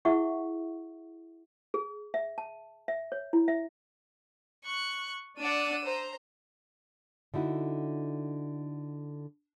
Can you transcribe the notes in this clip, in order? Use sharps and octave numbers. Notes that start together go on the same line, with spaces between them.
E4 G#4 E5 F#5 C#6
G#4
E5
A5
E5
C#5
E4
E5
C#6 F#6
D4 D5 F#5 E6 D#7
C5 A#5
D3 D#4 E4 F#4